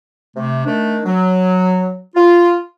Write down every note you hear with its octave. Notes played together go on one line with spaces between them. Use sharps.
C3 A3
D#3 A3 D4
F#3
F4